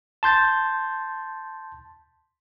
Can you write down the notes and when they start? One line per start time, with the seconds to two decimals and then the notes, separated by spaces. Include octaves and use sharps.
0.23 A5 C6 G6 A6